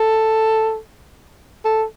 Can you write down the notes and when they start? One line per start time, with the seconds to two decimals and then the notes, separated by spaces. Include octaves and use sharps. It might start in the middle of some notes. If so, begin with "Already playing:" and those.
Already playing: A4
1.65 A4